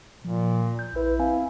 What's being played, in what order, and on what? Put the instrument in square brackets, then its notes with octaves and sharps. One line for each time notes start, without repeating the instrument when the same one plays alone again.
[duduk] A#2 [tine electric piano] F3
[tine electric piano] G6
[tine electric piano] A#1 B4 [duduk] E4
[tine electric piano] C4 F5 G#5